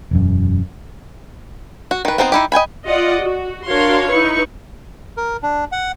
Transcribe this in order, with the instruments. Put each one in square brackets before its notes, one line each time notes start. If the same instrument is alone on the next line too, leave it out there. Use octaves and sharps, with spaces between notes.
[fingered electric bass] E1 F#2
[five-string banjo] F#4
D#3 B4
B3 C4 D#4 A4 C5
D#4 E4 G4
D#5 G5 G#5 B5
[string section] F4 D5 D#5 F#5
F#4
D4 F#4 A#4 C#5 F5 C6
D#4 E4 B4 C#6
[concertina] A#4
D4
F#5